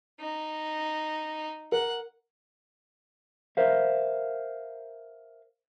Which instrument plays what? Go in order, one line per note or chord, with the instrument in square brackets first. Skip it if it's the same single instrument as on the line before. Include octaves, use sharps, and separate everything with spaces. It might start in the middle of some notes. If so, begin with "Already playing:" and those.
[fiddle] D#4
[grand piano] A#4 [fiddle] F#5
[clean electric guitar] A#4 C5 E5 F5